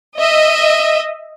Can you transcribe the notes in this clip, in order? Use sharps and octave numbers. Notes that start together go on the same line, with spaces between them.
D#5 E5